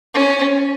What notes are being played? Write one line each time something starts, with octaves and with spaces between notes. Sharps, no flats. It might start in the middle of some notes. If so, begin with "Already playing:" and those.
C#4